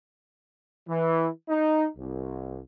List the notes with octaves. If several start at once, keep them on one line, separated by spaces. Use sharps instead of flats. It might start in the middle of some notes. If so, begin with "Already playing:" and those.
E3
D#4
C2